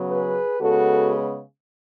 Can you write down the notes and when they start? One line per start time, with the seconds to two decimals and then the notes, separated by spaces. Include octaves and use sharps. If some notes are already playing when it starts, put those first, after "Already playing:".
Already playing: C#3 F#3 B3
0.10 G#4 B4
0.60 C#3 G#3 B3 F#4 A4